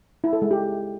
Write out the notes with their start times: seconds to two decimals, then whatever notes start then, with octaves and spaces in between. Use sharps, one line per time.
0.24 E4
0.33 A4
0.42 G#3
0.51 G4